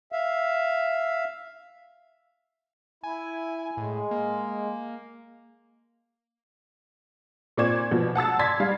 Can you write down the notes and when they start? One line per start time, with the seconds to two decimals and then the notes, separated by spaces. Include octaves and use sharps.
0.12 E5 F5
3.03 E4 G#5
3.77 A2 G#3
4.11 A#3
7.57 A#2 C4 D5 C#6 G#6 E7
7.91 B2 F3
8.15 F#5 A5 E6 A6
8.39 D5 C6 G#6 A6 B6
8.60 G3 F5